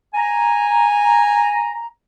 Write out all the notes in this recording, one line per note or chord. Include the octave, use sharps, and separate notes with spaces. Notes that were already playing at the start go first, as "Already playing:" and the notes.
G#5 A#5